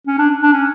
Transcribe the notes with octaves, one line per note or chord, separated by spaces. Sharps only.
C#4
D4
D4
C#4